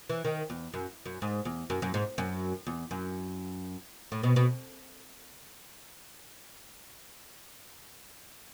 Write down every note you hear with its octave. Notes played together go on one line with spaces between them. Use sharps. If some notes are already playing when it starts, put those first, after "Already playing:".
E3
D#3
E2
F#2
F#2
G#2
E2
F#2
F#2
G#2
F#2
E2
F#2
A2
B2
B2